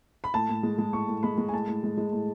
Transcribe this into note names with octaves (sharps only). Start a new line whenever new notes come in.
B5
A2 A5
A2
G#3
G#3
A2 C#6
A2
G#3 B5
G#3
G#5
A2 A5
A2
G#3
G#3
A2